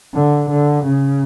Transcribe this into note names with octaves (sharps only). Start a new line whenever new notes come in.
D3
D3
C#3